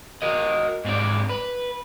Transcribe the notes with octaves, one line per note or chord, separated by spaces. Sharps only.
F#4 A#4 D#5
G#2 C4 D4 D5
B4